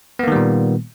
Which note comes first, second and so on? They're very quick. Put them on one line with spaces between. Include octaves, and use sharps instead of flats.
B3 A#3 D#3 G3 A#2